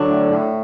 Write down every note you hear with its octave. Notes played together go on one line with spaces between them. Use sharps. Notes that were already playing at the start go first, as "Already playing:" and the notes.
Already playing: D3 F#3 D4
A2
A2